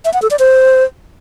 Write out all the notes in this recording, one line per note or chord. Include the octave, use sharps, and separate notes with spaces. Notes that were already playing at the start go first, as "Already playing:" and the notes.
E5
F#5
A4
D5
C5